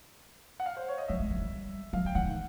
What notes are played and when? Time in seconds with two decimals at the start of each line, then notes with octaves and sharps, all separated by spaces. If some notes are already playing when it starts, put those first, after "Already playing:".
0.60 F#5
0.66 F5
0.77 C5
0.88 C#5
0.98 D#5
1.08 F#3 E5
1.20 G#3
1.30 G3
1.37 F#3
1.41 G3
1.93 F#3 F5
2.05 F#3 G5
2.15 E3 F#5
2.25 D#3